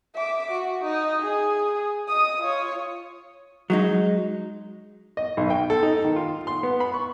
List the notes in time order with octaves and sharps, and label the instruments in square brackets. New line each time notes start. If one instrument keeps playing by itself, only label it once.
[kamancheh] E5 D6
F#4
D#4 D#5
G#4
D#5 D#6
F4 C#5
[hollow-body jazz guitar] F#3 G#3 D#4
[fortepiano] D#5
B1
G5
A4
D#4
D#3
F4
C6
B3
B5
C#6